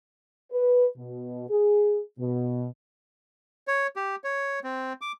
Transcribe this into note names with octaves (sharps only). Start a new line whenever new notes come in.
B4
B2
G#4
B2
C#5
G4
C#5
C4
D6